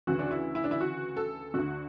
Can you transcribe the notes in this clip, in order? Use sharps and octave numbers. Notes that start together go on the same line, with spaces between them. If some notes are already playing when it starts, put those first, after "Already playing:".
D2 C#3 E3 F#4
D4
E4
E4
D4
E4
F#4
A4
D2 D3 F#4